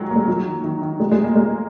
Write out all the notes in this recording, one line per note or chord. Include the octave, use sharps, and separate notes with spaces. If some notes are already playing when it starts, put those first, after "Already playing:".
Already playing: D#3 F#3 G#3
A#3
G#3
F#3
D#3
D#3
D#3
G#3
G#3
A#3
G#3